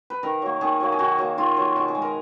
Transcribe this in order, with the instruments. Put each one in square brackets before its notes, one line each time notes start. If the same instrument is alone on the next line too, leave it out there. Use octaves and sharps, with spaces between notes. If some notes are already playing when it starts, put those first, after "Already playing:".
[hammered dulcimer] B4
D#3 A#4
F#3 A#3
D#3 G#4
F#3 A#3
G#4
D#3 F#4
F#3 A#3
D#3 F4
F#3 A#3
B2 F#4
G#4
G#3
A#4